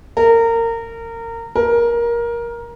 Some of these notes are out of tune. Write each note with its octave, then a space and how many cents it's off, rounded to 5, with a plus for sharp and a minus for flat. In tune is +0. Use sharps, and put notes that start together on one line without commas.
A#4 -25
A#4 +15